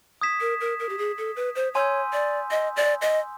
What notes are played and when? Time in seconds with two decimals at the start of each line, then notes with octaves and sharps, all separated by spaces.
0.21 D#6 G#6 B6 E7
0.41 A#4
0.60 A#4
0.79 A#4
0.89 G4
0.98 G#4
1.18 A4
1.36 B4
1.55 C5
1.74 C#5 G#5 C6 E6 G6
2.13 D5
2.51 D#5
2.76 D5
3.01 D#5